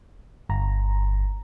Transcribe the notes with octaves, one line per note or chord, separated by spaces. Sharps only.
G1 A#5